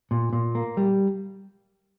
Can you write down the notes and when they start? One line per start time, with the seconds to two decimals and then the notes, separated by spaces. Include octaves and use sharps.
0.11 A#2
0.33 A#2
0.55 A#3
0.77 G3